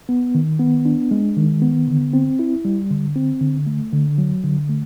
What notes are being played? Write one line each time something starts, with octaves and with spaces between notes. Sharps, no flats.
B3
D#3
B3
D4
G#3
D#3
B3
D3
C4
E4
G3
D3
C4
D3
A3
D3
F#3
D3
A3